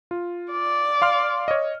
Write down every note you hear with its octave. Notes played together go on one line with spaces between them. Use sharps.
F4
D5
F5 C6 F6
C#5 D#5